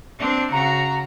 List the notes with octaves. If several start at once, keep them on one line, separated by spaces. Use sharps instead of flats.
C4 D4
C#3 F#4 A#5